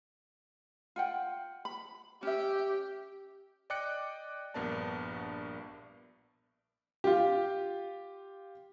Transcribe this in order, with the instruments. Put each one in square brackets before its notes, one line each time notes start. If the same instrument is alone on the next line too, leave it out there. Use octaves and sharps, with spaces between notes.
[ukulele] F4 F#5 G5
B5
[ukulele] C#4 E5 [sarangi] G4
[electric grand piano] D5 D#5 G5 D6 F#6 C#7
A#1 G2 B3 A#4 D5 A5
[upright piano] F4 G4